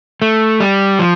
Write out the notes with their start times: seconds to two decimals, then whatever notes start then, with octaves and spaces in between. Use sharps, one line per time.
0.22 A3
0.60 G3
0.99 F3